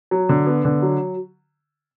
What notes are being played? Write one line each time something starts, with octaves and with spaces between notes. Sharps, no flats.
F#3
D3
B3
D3
F#3